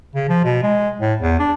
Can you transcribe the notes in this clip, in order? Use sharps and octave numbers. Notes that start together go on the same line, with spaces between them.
C#3
F3
B2
G#3
A2
E2
D4